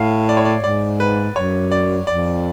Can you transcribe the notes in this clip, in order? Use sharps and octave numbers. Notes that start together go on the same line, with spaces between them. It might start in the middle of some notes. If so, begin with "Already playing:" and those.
Already playing: A2 F5
D5
C#5
D5
G#2 D5
B4
F#2 C#5
D5
F2 D5